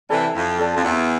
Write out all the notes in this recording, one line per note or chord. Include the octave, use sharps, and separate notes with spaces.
C3 E3 A4 D5 A5
F2 E4
A4 D5 A5
F2
E2 E4